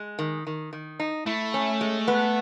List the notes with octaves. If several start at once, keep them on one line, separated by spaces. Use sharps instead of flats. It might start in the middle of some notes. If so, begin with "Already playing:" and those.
Already playing: G#3
D#3
D#3
D#3
D#4
A3 E4
C#4
G#3
B3